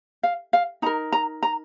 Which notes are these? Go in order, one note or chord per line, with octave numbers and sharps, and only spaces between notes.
F5
F5
D#4 A#4 A#5
A#5
A#5